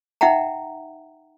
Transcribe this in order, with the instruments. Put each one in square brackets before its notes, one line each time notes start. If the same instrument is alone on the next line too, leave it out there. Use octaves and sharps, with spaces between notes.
[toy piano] D#4 E5 F#5 G5 A#5